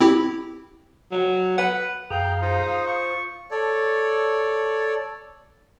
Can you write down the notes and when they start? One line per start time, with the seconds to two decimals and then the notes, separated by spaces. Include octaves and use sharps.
0.01 C4 E4 G4
1.12 F#3
1.58 B4 F#5
2.10 F#2 G#4 F5 G5 A#5
2.41 D#4 F4 C5
2.63 D#6
2.87 C#6
3.51 A4 C#5 D5